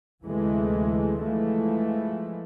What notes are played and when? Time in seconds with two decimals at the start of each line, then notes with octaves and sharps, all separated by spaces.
0.22 D2 C3 E3 G#3 A3
1.20 E3 F3 G#3 A3